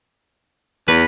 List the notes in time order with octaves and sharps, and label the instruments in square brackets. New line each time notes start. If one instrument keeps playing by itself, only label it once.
[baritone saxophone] E2 [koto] B4